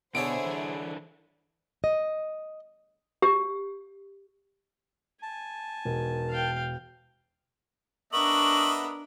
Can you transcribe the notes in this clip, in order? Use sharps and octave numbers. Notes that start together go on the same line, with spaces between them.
B2 D3 E4 G#4 A4 C5 C#5 D7
E3 D4
D#5
G4
G#5 A5
E1 D#3
F5 G5
B3 D4 A#4 D#5 E5 C#6 F#7